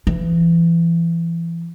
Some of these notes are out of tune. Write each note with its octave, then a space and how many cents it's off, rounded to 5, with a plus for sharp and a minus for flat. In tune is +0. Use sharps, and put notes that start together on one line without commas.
E3 +30